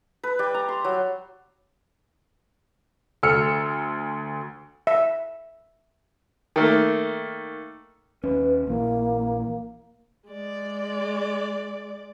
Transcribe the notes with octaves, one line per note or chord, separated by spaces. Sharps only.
B4
G3
A#5
C6
F#3
D2 A4 E6 F6 C#7
E5
D#3 A3 A#3
D#2 C#4 B4
A#1 E3 A#3
G#3 D5